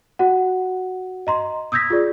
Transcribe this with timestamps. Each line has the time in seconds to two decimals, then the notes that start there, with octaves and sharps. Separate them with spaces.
0.19 F#4 F#5
1.27 D#5 A#5 C6
1.72 D#6 E6 G6 G#6 A#6 B6
1.90 F4 G#4 D5